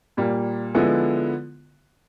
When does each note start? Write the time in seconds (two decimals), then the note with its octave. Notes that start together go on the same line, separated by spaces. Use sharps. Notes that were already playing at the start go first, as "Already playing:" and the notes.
0.17 A#2 G3 A#3
0.75 D3 F3 G#3 B3 E4